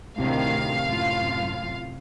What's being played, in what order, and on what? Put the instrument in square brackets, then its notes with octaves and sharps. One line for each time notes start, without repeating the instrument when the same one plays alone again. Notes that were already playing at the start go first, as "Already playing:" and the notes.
[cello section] D2 A2 D#3 [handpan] C3 C4 E4 [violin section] F5
[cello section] F#2 A2 F4